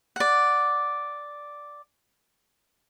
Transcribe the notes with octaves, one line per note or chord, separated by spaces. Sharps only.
D5 F#5